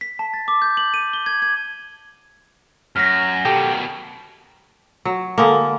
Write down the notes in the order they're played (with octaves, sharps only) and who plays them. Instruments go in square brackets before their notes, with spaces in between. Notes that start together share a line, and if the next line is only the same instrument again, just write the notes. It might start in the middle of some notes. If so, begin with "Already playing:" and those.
[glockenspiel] B6
A5
A6
D6
G6
F#7
D#7
G7
G#6
G#6
[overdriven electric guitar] F#2 [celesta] F6 A#6
[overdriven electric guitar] B2 D#3 [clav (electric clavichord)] G4 A4 G5
[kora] F#3
D3 G#3 A#3